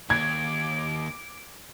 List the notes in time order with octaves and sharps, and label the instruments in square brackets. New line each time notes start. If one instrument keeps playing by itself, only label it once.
[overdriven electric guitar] D#2 [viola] D6 [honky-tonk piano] G#6